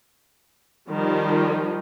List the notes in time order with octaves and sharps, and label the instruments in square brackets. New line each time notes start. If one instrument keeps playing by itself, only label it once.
[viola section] D#3 F3 G3